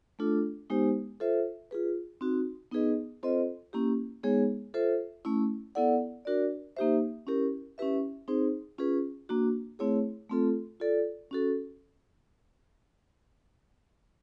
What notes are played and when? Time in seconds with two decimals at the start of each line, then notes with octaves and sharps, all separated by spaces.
0.19 A3 D4 F4 A4
0.70 G#3 B3 D#4 G4 C5
1.20 F4 A4 C5 E5
1.71 F4 G#4 B4
2.21 C4 D#4 F#4
2.72 B3 D#4 G#4 B4 D#5
3.23 C4 F4 A4 C5 D#5
3.73 A#3 C#4 E4 G4
4.23 G#3 B3 D#4 G#4 C#5
4.74 F4 A4 C5 E5
5.25 A3 C#4 E4
5.75 B3 E4 A4 D5 F#5
6.25 D4 F#4 A#4 D5
6.77 A#3 D#4 G4 C5 E5
7.27 C#4 E4 G4 A#4
7.78 C#4 E4 G4 B4 E5
8.28 C4 D#4 G#4 C5
8.78 C#4 F4 G#4 B4
9.29 A#3 D4 F#4
9.79 A3 C4 E4 G#4 C#5
10.29 A3 C4 F4 A4
10.80 F4 A4 D5
11.31 C#4 F#4 A4